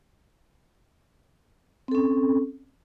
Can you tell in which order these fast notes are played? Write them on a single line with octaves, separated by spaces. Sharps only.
C4 A4 C#4